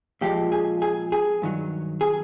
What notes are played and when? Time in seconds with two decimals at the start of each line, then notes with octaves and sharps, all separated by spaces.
0.21 A#2 F3 G#3 G4
0.52 G#4
0.82 G#4
1.12 G#4
1.42 G2 D#3 F#3
2.01 G#4